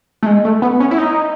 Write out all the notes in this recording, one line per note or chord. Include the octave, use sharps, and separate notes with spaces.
A3
G#3
A3
B3
C#4
E4
D#4